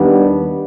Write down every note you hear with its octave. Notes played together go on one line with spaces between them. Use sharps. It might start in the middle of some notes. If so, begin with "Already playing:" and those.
Already playing: D#2 D#3 G3 B3 D4